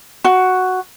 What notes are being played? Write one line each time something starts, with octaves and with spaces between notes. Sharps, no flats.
F#4